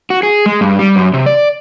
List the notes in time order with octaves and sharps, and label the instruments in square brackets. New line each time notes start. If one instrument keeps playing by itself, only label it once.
[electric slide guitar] F#4
G#4
G#3
G2
G3
F#2
C3
D5